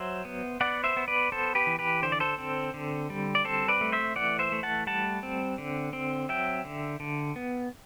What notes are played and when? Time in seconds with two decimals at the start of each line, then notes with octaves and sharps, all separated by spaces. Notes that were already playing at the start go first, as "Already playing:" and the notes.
Already playing: F#3 C5 E5
0.25 B3
0.61 B3 D5 F#5
0.84 C5 E5
0.97 B3
1.08 B4 D5
1.32 B3 A4 C5
1.55 G4 B4
1.67 E3
1.79 G4 B4
2.02 D3 C5
2.12 D5
2.20 A4 C5
2.38 C4
2.74 D3
3.10 G3
3.35 D5
3.44 C4 A4 C5
3.68 B4 D5
3.81 A3
3.92 C5 E5
4.16 E3 D5 F#5
4.39 C5 E5
4.52 A3
4.63 F#5 A5
4.87 G3 F#5 A5
5.23 C4
5.58 D3
5.93 C4
6.29 F#3 E5 G5
6.64 D3
7.00 D3
7.36 B3